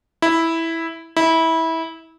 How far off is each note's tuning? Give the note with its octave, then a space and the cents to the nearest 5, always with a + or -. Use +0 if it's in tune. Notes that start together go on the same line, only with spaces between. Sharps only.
E4 -5
E4 -20